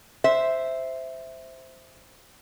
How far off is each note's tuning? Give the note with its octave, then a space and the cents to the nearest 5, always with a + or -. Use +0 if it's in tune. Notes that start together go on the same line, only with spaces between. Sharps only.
C5 -5 E5 +0